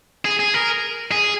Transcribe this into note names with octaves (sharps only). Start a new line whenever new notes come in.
G#4
G#4
A#4
G#4